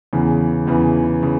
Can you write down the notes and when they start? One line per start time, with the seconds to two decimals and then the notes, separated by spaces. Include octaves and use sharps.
0.13 E2 C#3 E3
0.67 E2 C#3 E3
1.23 C#3